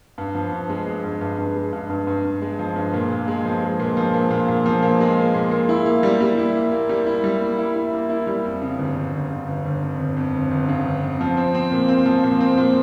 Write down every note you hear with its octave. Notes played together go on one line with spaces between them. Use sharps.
G2
F3
G2
G#3
G#3
G2
G2
G2
G#3
G2
G2
G2
G2
G#3
F3
G2
A#2
A#2
G#3
F3
G#3
A#2
F3
A#2
A#2
A#2
F3
A#2
G#3
A#2
A#2
A#2
E4
A#3
G3
G3
E4
A#3
A#3
G3
E4
G3
A#3
E4
E4
A#3
E4
G3
F2
C#3
G1
G1
G1
C#3
G1
G1
F2
G1
F2
G1
G1
C#3
G1
F2
F3
C4
C4
A#2
C4
F3
A#2
C4
A#2